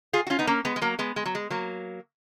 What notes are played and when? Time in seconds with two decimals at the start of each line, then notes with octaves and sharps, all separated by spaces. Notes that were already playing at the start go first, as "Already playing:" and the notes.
0.13 F4 G#4
0.27 F#4
0.30 C#4 F4
0.39 B3 D#4
0.47 A#3 C#4
0.65 G#3 B3
0.76 G#3
0.81 F#3 A#3
0.99 G#3 B3
1.16 G#3
1.25 F#3
1.35 G#3
1.50 F#3 A#3